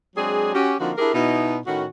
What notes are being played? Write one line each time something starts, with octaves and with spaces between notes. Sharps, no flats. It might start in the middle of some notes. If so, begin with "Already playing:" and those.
F#3 G#3 C4 D4 G#4
C#4 F#4 G4
D3 F3 A#3 C4 D#4 F#4
D4 E4 G4 G#4 A#4
B2 D#4 E4
A2 D#3 C#4 F#4